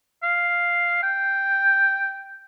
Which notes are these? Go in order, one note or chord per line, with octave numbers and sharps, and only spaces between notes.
F5
G5